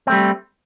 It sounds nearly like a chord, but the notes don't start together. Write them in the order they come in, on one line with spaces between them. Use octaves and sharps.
C4 A3 G3